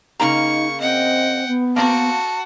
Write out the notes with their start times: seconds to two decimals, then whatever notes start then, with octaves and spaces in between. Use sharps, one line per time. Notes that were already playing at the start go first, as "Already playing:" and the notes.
0.20 C#3 A#3 D#4 A#5 C#6
0.80 C4 D#5 F#5 G5
1.47 B3
1.76 A#3 C4 F#4 A5